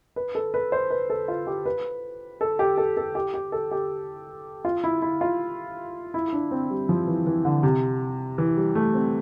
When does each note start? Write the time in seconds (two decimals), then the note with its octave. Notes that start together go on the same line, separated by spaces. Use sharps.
0.16 B4
0.35 A4
0.54 B4
0.72 C5
0.91 B4
1.10 A4
1.28 F4
1.47 G4
1.66 B4
2.41 A4
2.59 G4
2.77 A4
2.97 A4
3.15 G4
3.34 G4
3.52 A4
3.71 G4
4.65 F4
4.84 E4
5.02 E4
5.21 F4
6.14 E4
6.33 D4
6.51 C4
6.70 G3
6.89 F3
7.08 E3
7.27 E3
7.45 D3
7.63 C3
8.38 E3
8.57 G3
8.75 A3
8.94 C4